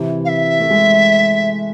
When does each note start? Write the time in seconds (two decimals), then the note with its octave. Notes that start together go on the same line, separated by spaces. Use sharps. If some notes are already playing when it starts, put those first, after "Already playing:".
Already playing: C3 E3
0.25 F5
0.29 E5
0.60 A3
0.70 G#3